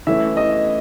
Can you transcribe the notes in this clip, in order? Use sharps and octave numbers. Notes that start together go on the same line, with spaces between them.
E3 A3 C#4 E4 E5
D#5